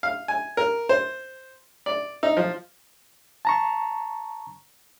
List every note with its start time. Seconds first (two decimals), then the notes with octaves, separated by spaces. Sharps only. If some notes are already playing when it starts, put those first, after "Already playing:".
0.03 F5
0.28 G#5
0.57 A#4
0.89 C5
1.86 D5
2.23 D#4
2.37 F3
3.45 A5 A#5 C#6